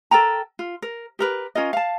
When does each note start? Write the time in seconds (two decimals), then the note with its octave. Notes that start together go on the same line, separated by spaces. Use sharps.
0.11 A4 A#4 G5 A#5
0.59 F4
0.82 A#4
1.19 G4 A#4 B4
1.55 C#4 F4 A#4 D#5
1.73 F5 A5